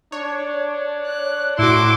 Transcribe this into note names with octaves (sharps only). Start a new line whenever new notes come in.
D4 C#5
F#6
A2 E4 F#4 C6 D6